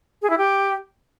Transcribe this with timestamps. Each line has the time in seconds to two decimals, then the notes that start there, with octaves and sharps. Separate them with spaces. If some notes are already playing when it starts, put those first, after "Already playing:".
0.22 G#4
0.30 E4
0.38 G4